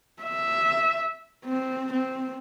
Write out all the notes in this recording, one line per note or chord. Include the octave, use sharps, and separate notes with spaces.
E5
C4
C4